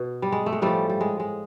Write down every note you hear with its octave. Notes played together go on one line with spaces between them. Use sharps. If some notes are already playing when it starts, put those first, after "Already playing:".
Already playing: B2
G3
G#3
A3
G#3
A2 F3 G3 A3
G3
G#3
G#3